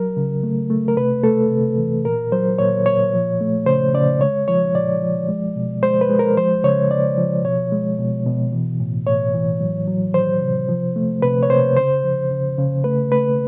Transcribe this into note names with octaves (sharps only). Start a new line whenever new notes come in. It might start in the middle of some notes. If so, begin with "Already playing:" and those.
Already playing: F#3 A#4
C#3
A3
A3
A#4
C3 B4
A3 A4
C3
E3
A#2 A#4
F#3 C5
A#2 C#5
A#2 C#5
F3
A3
C#3 C5
C#3 D5
G#3 C#5
F3 C#5
A#2 D5
F3
G#3
B2
G#3 C5
B4
G#3
A#4
F3 C5
C#3 C#5
C#3 D5
F3
B2 C#5
G#3
B2
B2
E3
A2
A2 C#5
E3
F#3
F#3
D#3 C5
C3
F3
A3
C3 B4
C#5
C3 C5
C#3 C5
F3
C#3
C#3
A3 B4
A3 B4